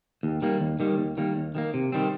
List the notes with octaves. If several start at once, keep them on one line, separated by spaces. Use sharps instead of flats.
D#2
D#3 G3 A#3
D#2
D#3 G3 A#3
D#2
D#3 G3 A#3
D#2
D#3 G3 A#3
C3
D#3 G3 C4